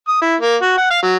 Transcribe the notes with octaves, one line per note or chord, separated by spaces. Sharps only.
D#6
E4
A#3
F#4
F#5
F5
F#3